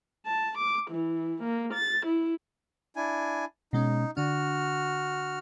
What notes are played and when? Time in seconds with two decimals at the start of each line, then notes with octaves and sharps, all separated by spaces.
0.25 A5
0.57 D6
0.90 E3
1.42 A#3
1.73 A6
2.06 E4
2.96 D4 E4 G#5
3.73 B2 G#3 C#4 D#4
4.17 D3 D4 F#4 F6